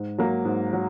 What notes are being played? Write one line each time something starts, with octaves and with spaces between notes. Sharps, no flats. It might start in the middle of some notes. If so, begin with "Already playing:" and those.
Already playing: G#2
F#3 A#3
G#2
F#3